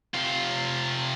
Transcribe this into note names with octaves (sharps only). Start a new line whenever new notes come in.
C3 F4